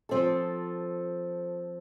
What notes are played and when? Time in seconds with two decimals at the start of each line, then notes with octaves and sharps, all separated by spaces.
0.09 F3 C4 A4